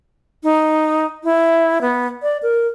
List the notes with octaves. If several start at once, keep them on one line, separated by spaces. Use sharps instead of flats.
D#4
E4
B3
D5
A#4